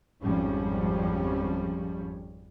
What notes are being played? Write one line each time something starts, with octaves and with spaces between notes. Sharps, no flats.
G#1 F2 F3 G3 C#4